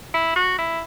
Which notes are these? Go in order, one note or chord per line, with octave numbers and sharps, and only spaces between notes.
E4
F#4
E4